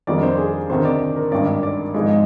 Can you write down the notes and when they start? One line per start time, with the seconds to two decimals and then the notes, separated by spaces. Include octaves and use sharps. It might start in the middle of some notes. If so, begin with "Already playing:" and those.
0.07 F2 D#3 G3 D4 D5
0.23 C5
0.38 G#4
0.70 D2 C3 D#3 C5
0.85 D5
1.16 A#4
1.32 G#1 G2 D#3 D5
1.63 D5
1.94 G#1 G#2 F3 G#3 D#4 D5
2.05 F5
2.10 D#5